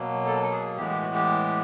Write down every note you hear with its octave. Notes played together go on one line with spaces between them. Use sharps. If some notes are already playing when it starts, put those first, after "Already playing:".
Already playing: B2 F#3 A#3
A4
G#4
A2 E3 G#3 B3 G4
G4
F#4
G4